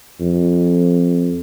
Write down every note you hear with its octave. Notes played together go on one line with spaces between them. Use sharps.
F2